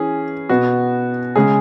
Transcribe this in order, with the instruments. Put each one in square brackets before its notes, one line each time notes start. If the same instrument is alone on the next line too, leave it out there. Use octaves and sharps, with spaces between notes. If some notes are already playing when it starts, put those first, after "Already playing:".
Already playing: [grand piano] E3 C#4 G#4
B2 B3 F#4
C#3 G#3 C#4 G#4